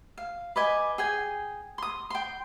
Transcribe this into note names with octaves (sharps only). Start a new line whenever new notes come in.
F5
B4 D5 D#5 G#5
G#4 G5 G#5
C6 D#6
G5 C6